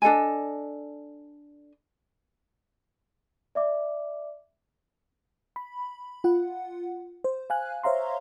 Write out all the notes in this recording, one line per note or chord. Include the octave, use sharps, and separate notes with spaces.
D4 A4 D#5 G#5
D5 E5 D6
B5
F4 F#5
C5
F5 G#5 F#6
C5 C#5 E5 F5 A#5 C6